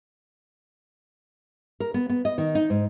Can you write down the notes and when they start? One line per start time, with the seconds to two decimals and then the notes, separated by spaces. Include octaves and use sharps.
1.80 A#4
1.94 B3
2.10 B3
2.25 D#5
2.38 D#3
2.55 D#4
2.70 G#2